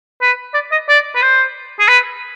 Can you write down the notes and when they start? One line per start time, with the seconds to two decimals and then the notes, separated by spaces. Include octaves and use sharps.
0.21 B4
0.54 D5
0.72 D#5
0.88 D5
1.15 B4
1.22 C5
1.80 G#4
1.88 B4